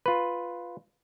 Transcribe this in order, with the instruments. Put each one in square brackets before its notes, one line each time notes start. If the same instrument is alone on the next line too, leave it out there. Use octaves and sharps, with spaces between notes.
[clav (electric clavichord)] F4 B4